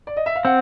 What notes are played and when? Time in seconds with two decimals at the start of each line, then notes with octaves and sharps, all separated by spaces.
0.07 D5
0.17 D#5
0.26 E5
0.36 F5
0.45 C4 F#5